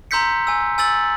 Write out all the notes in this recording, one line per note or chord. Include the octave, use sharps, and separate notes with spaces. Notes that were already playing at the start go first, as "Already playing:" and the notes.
A#5 C6 E6 G6 B6 C#7
G#5 E6
G#5 E6 A6 F#7